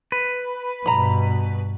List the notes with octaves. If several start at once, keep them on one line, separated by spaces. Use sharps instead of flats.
B4
G2 B2 A#5 B5